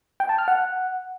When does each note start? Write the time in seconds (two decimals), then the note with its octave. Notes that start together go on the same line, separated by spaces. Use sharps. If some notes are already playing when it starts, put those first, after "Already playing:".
0.20 G5
0.29 A5
0.38 F6
0.48 F#5